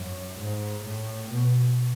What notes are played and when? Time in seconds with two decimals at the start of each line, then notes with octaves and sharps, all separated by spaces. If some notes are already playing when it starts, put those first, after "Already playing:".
Already playing: F#2
0.39 G#2
0.85 A2
1.31 B2